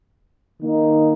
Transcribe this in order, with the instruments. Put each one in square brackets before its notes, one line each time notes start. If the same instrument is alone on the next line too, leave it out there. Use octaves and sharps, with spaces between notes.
[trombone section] D#3 A#3 D#4